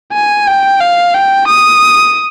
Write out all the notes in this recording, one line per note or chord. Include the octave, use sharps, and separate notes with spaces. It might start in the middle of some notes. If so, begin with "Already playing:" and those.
G#5
G5
F5
G5
D#6